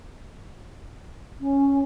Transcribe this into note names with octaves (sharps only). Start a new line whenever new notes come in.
C#4